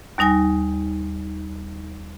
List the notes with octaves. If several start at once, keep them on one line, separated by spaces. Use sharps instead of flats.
D#2 G3 D#4 G#5 A#6